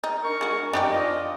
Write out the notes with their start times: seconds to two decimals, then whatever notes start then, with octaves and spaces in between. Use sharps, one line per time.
0.04 D#4
0.23 D4 A#4 C#6
0.41 G#3 F#4
0.73 F#2 F3 D4 D#4 G4
0.91 F4 D5 D#5